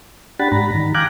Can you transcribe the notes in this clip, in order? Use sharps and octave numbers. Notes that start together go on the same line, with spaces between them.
D4 G4 F#5 B5 A6
G#2 A#5 B5
D#3
F5 G5 G#5 A#5 D6 F#6